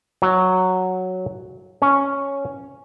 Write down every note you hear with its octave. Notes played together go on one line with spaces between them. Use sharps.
F#3
C#4